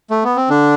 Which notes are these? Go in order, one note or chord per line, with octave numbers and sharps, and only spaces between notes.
A3
B3
C4
D3 D4